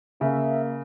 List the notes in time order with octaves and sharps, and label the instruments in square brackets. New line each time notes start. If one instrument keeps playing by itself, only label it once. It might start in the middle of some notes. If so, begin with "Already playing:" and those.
[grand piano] C#3 [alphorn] A#3 [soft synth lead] E5